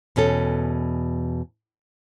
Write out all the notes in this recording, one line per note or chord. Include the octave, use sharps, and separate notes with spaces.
E2 B2 C#4 A4